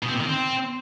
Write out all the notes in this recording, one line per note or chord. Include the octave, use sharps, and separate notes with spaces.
B2
C4
A#2
D#3
C4